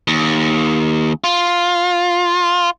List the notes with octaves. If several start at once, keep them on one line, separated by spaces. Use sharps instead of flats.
D#2
F4